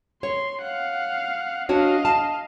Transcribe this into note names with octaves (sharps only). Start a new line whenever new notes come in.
C#5 C6
F5 F#5
D4 F#4 C#5 D#5 F5
A5